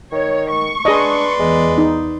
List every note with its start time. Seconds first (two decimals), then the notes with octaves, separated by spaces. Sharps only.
0.12 D#3 C#5
0.52 C#6
0.85 D4 G#4 B4 D5 D#5 C6
1.39 E2 G#3
1.78 D#4